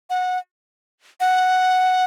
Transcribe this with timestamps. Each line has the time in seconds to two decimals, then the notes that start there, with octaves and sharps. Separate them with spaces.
0.10 F#5
1.20 F#5